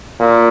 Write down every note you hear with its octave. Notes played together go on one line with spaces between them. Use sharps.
A#2